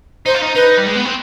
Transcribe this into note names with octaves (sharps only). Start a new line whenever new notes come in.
D#4 C5
F4
D#4
D#4 B4
G3
G#3
B3
C4